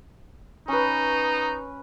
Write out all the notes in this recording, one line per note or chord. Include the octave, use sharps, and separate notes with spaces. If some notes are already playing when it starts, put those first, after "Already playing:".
C#4 D#4 B4